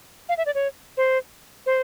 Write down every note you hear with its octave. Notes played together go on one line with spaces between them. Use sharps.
F5
E5
D5
C#5
C5
C5